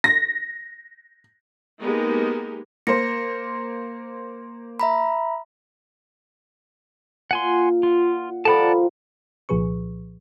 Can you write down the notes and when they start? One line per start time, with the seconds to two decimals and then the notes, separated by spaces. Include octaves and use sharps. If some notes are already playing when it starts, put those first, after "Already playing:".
0.04 A#6
1.81 G#3 A#3 B3 D#4 G4
2.87 A#3 A#4 C5 A#6 C#7
4.80 E5 A#5 B5
7.31 A#2 F#5 G#5 C6
7.83 F4 F#5
8.45 D#3 F3 G3 A4 D5 F#5 A5 B5
9.49 C2 A#2 F3 G#4 B4 C#6